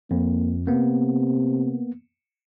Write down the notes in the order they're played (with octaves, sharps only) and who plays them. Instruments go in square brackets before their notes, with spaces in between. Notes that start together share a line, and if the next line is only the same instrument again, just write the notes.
[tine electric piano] F2 [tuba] A#3
[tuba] C3 [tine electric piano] A#3 B3